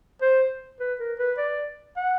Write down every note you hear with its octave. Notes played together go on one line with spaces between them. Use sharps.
C5
B4
A#4
B4
D5
F#5